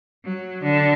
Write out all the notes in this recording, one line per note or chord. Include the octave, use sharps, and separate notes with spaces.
F#3
D3